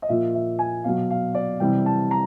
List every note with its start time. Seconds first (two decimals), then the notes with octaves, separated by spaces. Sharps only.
0.02 D#5
0.09 A#2 F3 E5
0.35 E5
0.59 G#5
0.84 B2 F#3 F5
1.11 F5
1.35 D5
1.60 C3 E3 G3 G5
1.86 A5
2.11 A#5